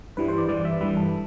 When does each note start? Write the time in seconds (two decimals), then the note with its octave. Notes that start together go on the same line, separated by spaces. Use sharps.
0.17 G2 E3 G3 B4
0.28 C5
0.38 D5
0.49 G2 E3 G3 D5
0.65 E5
0.81 G2 E3 G3 B4
0.97 A4